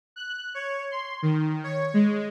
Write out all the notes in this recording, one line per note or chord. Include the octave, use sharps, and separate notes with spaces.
F#6
C#5
C6
D#3
C#5
G#3